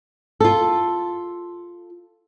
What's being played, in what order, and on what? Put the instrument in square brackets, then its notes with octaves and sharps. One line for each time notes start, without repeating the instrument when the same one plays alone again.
[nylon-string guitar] F4 A4